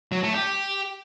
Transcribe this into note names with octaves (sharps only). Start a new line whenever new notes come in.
F#3
A3
G4